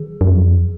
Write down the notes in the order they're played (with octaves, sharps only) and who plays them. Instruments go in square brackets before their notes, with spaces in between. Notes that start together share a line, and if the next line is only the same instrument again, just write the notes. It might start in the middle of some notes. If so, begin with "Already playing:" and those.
Already playing: [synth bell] D#3 G#4
[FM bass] F#2
F2